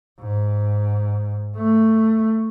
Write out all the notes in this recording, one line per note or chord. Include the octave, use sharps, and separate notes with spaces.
G#2
A3